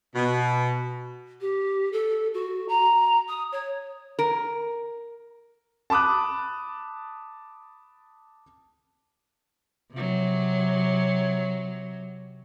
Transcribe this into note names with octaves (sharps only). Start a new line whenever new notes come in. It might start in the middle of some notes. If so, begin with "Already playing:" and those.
B2
G4
A4
F#4
A#5
D#6
C#5
A#4
A5 B5 D6 D#6 F#6
C3 F#3